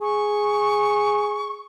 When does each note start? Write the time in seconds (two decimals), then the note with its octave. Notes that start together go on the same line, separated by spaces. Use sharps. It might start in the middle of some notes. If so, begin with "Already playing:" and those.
0.01 G#4 C#6